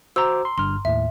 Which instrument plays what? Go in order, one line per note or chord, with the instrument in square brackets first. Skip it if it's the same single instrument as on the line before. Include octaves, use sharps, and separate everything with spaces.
[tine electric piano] F#4 C5 D6 [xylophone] A#5 E6
[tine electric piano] C6
[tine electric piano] G1 G2 F6 [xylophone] C6
[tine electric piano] D#2 A2 [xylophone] E5